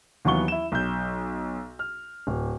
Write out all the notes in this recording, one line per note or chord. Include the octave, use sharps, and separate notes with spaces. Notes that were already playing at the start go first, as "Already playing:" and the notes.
D#2 E3 F#3 B3 C#6 G7
E4 E7
B1 G6
F6
D1